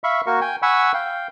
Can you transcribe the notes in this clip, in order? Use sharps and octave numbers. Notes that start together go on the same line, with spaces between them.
E5 F5 B5 C#6
A#3 F#4 A#4 C#6
G5 G#5
F#5 G#5 B5 C#6 E6
F5 G5